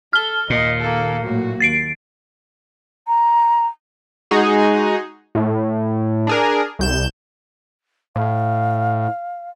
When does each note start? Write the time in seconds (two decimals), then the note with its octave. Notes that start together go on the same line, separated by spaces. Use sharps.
0.13 A4 F6 G7
0.50 D#2 A#2 D#5
0.80 A#3 A4
1.24 A2 F#3 A#3 F#4
1.60 D#2 A6 C7 D7
3.07 A#5
4.31 G#3 D#4 F#4 G#4
5.35 A2
6.27 D4 G#4 A#4
6.79 C2 G6 E7
8.16 A2 F5